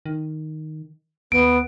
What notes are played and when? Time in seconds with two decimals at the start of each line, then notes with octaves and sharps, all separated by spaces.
0.06 D#3
1.32 D#2 B3 D7